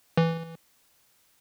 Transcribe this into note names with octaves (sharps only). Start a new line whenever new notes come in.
E3